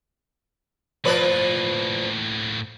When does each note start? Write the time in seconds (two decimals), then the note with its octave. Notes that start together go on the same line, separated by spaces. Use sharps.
1.05 A2 F3 A#3 B4 D5